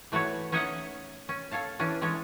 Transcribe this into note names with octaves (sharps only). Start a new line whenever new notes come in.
E3 A3 F#4 B4 C#5
C#4 D#4 C#5 D#5 E5 F#5
C#4
A4 C#5 F5 A5
E3 C#4 D4
E3 G#3 C#4 A4 C#5